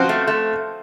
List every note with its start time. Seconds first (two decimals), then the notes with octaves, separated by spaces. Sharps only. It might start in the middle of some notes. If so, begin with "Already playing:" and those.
Already playing: F3 C4 F#4 C5
0.09 A3
0.27 A3